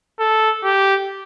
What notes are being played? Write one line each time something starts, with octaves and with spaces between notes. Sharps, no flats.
A4
G4